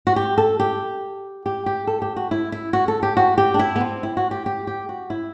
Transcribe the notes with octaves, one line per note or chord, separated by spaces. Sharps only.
F#4
G4
A4
G4
G4
G4
A4
G4
F#4
E4
E4
F#4
A4
G4
F#4
G4
D4
E4
B3
C4
E4
F#4
G4
G4
G4
F#4
E4